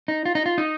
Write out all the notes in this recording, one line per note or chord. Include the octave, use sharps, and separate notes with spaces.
D#4
F4
D#4
F4
D#4